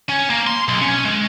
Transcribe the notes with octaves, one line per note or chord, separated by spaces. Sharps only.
C#4
A#3
C6
B1
C#4
G#3